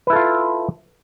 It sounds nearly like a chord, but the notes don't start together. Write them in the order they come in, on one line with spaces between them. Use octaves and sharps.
B4 E4 A4 F4